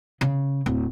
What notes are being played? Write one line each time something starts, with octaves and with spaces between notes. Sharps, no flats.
C#3
D1